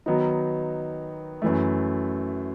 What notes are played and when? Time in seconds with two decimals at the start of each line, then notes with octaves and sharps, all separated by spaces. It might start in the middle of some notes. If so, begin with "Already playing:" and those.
0.06 D#3 F#3 B3 D#4
1.42 F#2 E3 A3